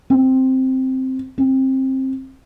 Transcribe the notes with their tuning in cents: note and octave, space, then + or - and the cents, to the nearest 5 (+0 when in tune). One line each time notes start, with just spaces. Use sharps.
C4 +0
C4 +20